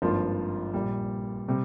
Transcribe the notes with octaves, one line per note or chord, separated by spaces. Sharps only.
G#1 G2 F3 A#3 F4
A#1 A#2 G3
C3 G3